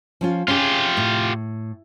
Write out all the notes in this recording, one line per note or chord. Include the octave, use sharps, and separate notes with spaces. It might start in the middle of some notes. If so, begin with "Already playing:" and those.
F3 C#4 F4
C#4 F4 G4 G#4
A2